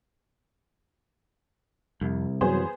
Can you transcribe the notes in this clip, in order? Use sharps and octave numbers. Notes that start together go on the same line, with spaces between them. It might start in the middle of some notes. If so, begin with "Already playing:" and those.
C2 F2
F#2 E3 F#3 B3 G#4 C5